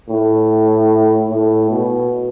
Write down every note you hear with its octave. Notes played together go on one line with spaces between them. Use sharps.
A2
A2
B2